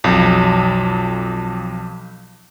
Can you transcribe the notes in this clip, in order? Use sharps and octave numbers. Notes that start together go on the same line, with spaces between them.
B1 F2